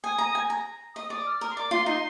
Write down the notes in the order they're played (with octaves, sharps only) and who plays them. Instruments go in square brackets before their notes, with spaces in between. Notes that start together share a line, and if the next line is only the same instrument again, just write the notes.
[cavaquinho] G#5 [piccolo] D#6
[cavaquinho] A#5
G#5
A#5
[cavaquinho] D#5 [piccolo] D#6
[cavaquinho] D5 [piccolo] D#6
[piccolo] F6
[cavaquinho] A#4 [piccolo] D#6
[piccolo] C6
[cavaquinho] D5 [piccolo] D6
[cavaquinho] F4 [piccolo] C6
[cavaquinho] D#4 [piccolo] C6